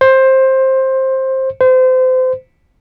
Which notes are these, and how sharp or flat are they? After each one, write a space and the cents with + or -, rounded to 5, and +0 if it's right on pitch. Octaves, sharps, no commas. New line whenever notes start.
C5 +15
C5 -30